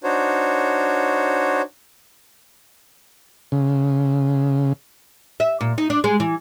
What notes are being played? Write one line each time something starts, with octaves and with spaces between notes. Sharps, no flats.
D4 D#4 F#4 C5 C#5
C#3
E5
A#2
D#4
D4
G#3
E3